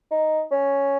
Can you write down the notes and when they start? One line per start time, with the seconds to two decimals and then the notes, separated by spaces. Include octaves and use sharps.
0.11 D#4
0.52 C#4